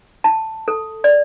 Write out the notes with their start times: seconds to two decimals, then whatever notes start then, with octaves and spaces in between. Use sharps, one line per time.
0.24 A5
0.68 A4
1.04 D5